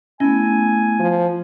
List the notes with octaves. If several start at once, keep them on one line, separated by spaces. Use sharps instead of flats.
A3 B3 C#4 E4 G#5
F3